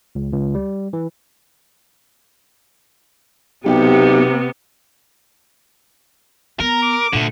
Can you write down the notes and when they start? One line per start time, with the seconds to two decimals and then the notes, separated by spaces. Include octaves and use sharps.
0.15 C#2
0.33 C#2
0.55 G3
0.93 E3
3.66 B1 C3 B3 G4
6.60 B3 A#4 A#5
6.82 D6
7.13 A#2 D3 A3